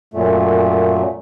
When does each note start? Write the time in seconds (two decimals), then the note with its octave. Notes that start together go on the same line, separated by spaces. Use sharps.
0.14 F#2 A#2 A3